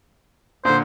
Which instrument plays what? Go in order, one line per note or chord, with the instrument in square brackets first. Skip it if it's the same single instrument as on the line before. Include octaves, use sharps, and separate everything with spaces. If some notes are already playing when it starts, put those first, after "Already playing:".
[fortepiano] A#2 D3 [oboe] C5